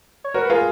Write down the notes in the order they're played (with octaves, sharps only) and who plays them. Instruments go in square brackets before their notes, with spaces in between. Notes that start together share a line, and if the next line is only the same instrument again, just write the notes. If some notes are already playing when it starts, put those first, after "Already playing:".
[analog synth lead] C#5
[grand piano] F#4 A#4 [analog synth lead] B4
[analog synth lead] B4
[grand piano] F4 G#4 [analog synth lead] A#4